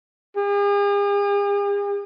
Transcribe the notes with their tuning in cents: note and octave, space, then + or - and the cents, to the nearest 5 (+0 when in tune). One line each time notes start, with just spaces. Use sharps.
G#4 -45